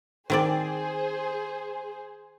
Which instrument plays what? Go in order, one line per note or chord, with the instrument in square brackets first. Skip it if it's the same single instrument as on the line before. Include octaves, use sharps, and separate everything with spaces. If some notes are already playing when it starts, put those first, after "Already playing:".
[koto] D#3 C4 D5 [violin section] G#4 C5